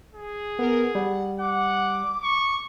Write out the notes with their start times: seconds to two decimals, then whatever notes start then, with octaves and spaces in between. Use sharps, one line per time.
0.14 G#4
0.59 B3 A#4
0.95 G3 F#5
1.40 F#5 D6
2.23 C#6